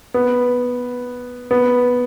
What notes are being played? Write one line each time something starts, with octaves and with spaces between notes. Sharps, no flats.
B3
B3